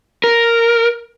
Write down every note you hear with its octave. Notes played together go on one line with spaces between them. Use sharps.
A#4